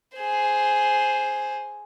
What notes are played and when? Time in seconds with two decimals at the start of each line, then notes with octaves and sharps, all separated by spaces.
0.17 G#4 C5